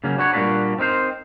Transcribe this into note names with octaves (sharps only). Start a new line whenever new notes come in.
C#3 F#3 A#3 C#4
D4 F#4 B4 C#5
A#2 G3 A#3 D4 F#4 B4
C4 D#4 A#4 C5